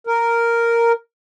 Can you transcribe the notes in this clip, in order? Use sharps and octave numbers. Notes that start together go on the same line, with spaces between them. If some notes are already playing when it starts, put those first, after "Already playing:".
A#4